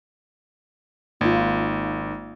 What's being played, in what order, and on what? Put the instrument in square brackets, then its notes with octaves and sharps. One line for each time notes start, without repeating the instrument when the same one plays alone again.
[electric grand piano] G#1 [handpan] A#3 F4 [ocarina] D#4